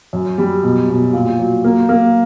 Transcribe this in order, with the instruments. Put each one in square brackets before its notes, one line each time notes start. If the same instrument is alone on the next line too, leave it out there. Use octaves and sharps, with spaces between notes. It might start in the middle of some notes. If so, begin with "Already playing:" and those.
[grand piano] F#2
G3
B2
B2
A#2
F#3
A#3
A#3